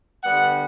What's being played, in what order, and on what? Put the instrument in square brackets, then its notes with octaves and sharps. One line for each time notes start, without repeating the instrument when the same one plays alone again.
[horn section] D3 G3 B3 F#5